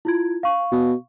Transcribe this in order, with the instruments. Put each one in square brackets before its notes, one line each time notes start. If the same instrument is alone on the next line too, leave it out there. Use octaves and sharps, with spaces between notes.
[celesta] E4 F4 G#6
F5 C#6
[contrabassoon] B2